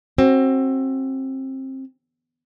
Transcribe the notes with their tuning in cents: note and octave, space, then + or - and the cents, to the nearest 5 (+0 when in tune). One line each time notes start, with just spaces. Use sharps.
C4 +25 F#4 +20